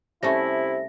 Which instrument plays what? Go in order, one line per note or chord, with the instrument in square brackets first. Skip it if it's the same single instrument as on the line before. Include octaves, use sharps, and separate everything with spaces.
[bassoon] C3 [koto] G3 A3 C#4 [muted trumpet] E4 [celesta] E5 A#6